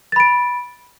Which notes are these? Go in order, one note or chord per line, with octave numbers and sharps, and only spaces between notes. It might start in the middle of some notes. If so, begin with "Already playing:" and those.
B5 A6 D7